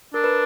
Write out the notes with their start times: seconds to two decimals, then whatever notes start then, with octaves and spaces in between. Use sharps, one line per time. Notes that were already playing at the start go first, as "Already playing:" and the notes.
0.14 D4 A#4
0.24 B4